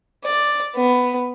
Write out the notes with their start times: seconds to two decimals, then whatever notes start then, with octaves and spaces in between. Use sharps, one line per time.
0.25 D5
0.75 B3